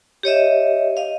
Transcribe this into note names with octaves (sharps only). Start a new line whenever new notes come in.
G4 C#5 D#5 E5
D#5 F5